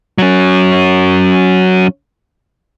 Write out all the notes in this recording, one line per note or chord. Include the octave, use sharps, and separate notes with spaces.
F#3 C#4